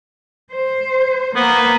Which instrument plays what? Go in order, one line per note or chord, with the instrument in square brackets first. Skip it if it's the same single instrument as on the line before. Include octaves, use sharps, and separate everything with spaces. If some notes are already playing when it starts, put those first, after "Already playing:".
[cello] C5
[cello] A#3 [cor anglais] B3